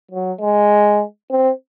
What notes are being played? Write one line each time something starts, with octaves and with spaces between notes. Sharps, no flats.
F#3
G#3
C4